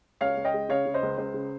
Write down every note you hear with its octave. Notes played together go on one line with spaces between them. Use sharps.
C#2 C#5 F5
C#2
D#5 G5
G#3
C#3 C#5 F5
C#3
C5 D#5
C#2
C#2 C5
C#3